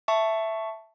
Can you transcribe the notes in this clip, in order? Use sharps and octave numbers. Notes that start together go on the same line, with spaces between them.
E5 A5 C#6